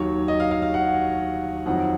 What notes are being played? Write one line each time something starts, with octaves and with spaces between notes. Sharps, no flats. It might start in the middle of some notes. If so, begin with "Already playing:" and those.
Already playing: D#2 D#3 F#3 C#5
D#5
F5
F5
F5
F#5
F2 D#3 F#3 F#5